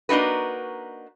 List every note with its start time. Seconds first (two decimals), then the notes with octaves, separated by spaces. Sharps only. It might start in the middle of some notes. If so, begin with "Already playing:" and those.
0.09 A#3 D4 D#4 F#4 B4